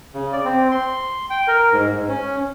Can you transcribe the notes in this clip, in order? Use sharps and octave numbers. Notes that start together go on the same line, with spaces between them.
C#3
D5
C4
C6
G5
A#4
G#2
G#2
C#4